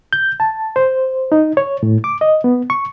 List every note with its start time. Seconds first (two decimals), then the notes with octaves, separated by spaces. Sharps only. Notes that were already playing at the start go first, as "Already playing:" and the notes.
0.13 G6
0.40 A5
0.76 C5
1.32 D#4
1.57 C#5
1.83 A2
2.04 D6
2.21 D#5
2.44 B3
2.70 C#6